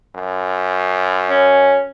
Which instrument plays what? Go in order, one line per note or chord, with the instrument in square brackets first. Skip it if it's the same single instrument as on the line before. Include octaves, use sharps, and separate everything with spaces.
[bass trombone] F#2
[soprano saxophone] C#4